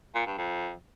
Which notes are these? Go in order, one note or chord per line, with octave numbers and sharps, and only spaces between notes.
A#2
G2
F2